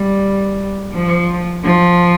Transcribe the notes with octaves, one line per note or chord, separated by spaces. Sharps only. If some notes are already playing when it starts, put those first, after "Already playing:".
Already playing: G3
F3
F3